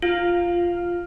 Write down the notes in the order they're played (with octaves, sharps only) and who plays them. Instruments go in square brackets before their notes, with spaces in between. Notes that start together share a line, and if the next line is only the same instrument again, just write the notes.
[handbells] F4 [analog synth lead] F5